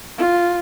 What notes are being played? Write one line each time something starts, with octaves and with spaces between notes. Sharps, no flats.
F4